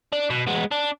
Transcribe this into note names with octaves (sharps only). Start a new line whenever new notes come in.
D4
B2
G#3 B3
D4